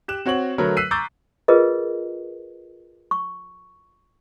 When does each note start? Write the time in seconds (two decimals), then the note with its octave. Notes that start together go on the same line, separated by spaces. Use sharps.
0.08 G4 F#6 E7
0.26 C4 F#4 C#5 C#6 F#7
0.58 D3 F#3 A3 A#4 B4 C#5
0.77 E6 F#6 B6 C7 D#7
0.91 A#5 C#6 D6 E6 G6 A6
1.48 F4 G#4 A#4 B4 D#5
3.11 C#6